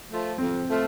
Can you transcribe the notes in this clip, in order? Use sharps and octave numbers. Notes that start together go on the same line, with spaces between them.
F3 A3 F4
F2 C4
F3 A3 F4